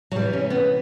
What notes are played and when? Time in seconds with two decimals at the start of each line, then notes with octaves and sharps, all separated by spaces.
0.12 F#3
0.15 C3 E3 G3
0.33 C#4
0.50 B3